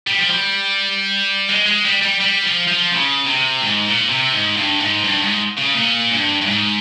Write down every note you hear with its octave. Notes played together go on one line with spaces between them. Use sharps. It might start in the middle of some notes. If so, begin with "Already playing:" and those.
G3
F3
G3
G#3
G#3
G3
G3
G3
F3
F3
C#3
C3
G#2
A#2
C3
G#2
G2
G#2
G2
G#2
C#3
A#2
G2
G2
G#2